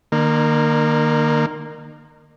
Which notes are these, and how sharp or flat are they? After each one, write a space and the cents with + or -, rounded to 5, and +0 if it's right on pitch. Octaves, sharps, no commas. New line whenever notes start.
D#3 -40 A#3 +0